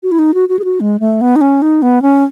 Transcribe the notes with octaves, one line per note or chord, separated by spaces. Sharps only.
F#4
E4
D#4
F#4
F#4
G#4
F#4
G#3
A3
B3
D#4
C#4
D#4
B3
C#4